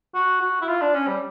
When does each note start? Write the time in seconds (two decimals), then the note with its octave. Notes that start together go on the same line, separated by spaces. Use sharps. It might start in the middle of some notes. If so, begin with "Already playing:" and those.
0.15 F#4
0.42 F#4
0.62 E4
0.68 F4
0.81 D4
0.94 C#4
1.07 G3